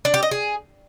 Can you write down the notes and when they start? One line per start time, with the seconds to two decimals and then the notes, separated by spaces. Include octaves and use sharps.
0.05 D4
0.14 G4
0.23 D#5
0.31 G#4